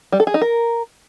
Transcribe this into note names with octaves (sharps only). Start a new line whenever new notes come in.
G3
A4
G#4
D#4
A#4